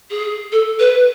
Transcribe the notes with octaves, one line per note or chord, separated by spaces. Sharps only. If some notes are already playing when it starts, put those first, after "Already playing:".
G#4
A4
B4